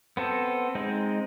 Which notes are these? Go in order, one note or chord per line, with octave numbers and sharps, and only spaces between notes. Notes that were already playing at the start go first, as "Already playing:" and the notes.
B3 C4 A4
G#3 C4 D#4